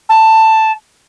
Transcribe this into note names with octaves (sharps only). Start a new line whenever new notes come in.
A5